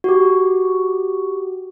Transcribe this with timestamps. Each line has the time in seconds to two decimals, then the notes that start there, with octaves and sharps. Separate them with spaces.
0.04 F#4 G4